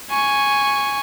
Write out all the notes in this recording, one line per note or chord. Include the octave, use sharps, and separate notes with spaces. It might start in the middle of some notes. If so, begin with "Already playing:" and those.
G#5 C#6